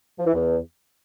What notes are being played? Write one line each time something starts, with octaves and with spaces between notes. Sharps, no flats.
F3
E3
E2